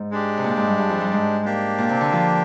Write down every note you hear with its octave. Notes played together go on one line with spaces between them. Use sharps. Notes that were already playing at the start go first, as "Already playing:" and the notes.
Already playing: G#2
G#3 D4 G4
C3
A#2
G#2
G2
G2
F2
G2
G#2
A#3 D4 G4
A#2
C3
D3
F3